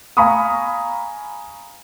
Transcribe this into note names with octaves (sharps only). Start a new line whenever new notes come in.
F5 G#5 A#5 B5 C#6 D#6